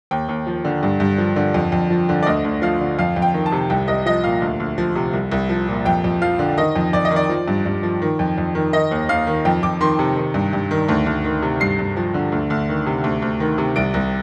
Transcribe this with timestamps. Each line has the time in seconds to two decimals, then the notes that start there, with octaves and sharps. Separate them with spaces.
0.11 D#2 G5
0.29 D#2
0.46 F3
0.65 D3
0.83 G2
1.00 G2
1.18 F3
1.36 D3
1.54 F2
1.72 F2
1.90 F3
2.09 D3
2.23 D5
2.26 D2 D#5
2.44 D2
2.62 F3 F5
2.80 D3
2.99 F2 F5
3.16 F2
3.22 G5
3.34 D#3
3.46 A5
3.52 C3
3.70 C2 G5
3.88 C2 D#5
4.06 F3 D#5
4.24 A#2 F5
4.42 D2
4.60 D2
4.78 F3
4.95 C3
5.13 C2
5.32 C2
5.49 F3
5.68 A#2
5.85 F2 G5
6.04 F2
6.21 F3 F5
6.39 D3
6.58 D#3 D#5
6.76 F2
6.93 F2 D5
7.05 D#5
7.11 D#3
7.16 D5
7.29 F3
7.48 G2
7.66 G2
7.83 F3
8.02 D#3
8.19 F2
8.38 F2
8.55 D#3
8.73 D#3 D#5
8.91 D#2
9.09 D#2 F5
9.27 D#3
9.45 F2 G5
9.63 F2 D6
9.81 D#3 C6
9.99 C3
10.17 D#3
10.34 G2
10.53 G2
10.71 D#3
10.89 D2
11.06 D2
11.24 D#3
11.42 C3
11.60 G2 C7
11.79 G2
11.97 F3
12.14 D3
12.32 D2
12.50 D2
12.69 D#3
12.86 C3
13.04 D2
13.22 D2
13.40 D#3
13.58 C3
13.76 C2 D7
13.94 C2